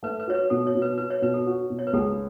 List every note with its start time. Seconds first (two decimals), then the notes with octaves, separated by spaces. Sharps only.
0.03 A3 B4
0.20 B4
0.27 F#4 C#5
0.34 B4
0.50 B2 A4
0.67 C#5
0.75 B2
0.82 B4
0.98 F#4 B4
1.11 C#5
1.22 B2 B4
1.34 A4
1.46 F#4
1.70 B2
1.79 C#5
1.87 B4
1.93 C#2 A4